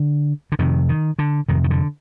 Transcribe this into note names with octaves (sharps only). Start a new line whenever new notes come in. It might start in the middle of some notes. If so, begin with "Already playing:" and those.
Already playing: D3
D3
F2 C3 D#3
D#3
D3
F2 C3 D#3
D#3
D3